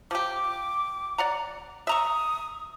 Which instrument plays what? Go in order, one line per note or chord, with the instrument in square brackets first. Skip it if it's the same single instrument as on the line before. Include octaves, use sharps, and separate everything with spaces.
[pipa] F3 G4 [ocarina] D6
[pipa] D5 F#5 A#5
[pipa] E5 A#5 C#6 [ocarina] D#6